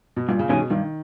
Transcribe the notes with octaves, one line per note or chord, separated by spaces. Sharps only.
B2
G2 A#2
C#3
B2 D#3 G3 C#4 G#4
G2 D#3